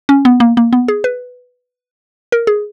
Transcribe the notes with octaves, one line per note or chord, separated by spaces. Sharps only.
C#4
B3
A#3
A#3
B3
G#4
B4
A#4
G#4